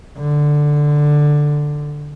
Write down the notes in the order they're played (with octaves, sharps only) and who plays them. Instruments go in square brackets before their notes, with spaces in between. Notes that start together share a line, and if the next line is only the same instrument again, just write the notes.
[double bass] D3